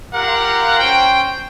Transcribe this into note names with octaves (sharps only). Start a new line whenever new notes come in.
F4 G4 A#4 F5 F#5
C#4 C5 G5